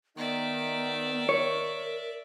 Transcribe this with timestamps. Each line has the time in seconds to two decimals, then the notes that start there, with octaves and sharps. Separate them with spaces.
0.17 D#3 B3 D#4 D5 E5
1.29 A#4 C#5